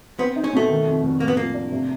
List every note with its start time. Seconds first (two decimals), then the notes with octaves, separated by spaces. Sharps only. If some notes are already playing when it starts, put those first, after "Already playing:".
0.19 B3 C4
0.36 D#4
0.44 C#4
0.53 B2 A3
0.69 D#3
0.86 F2
1.03 F1
1.20 A2 A#3
1.28 B3
1.37 F3 A#3
1.54 D4
1.71 C3